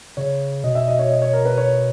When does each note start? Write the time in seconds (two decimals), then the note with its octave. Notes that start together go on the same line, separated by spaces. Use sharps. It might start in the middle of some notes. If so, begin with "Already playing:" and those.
0.17 C#3 C#5
0.64 B2 D#5
0.75 E5
0.88 D#5
0.99 C#5
1.11 D#5
1.22 C#5
1.33 A#4
1.45 B4
1.57 C#5